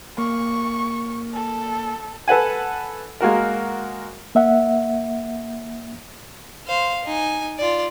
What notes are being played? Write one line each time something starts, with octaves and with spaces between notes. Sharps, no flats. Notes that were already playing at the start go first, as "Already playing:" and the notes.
A#3 C#6
A4
A4 B4 F#5 G#5
G#3 A#3 F#4 A#4
A#3 E5 F#5
C5 F5
D#4 G#5
F4 D5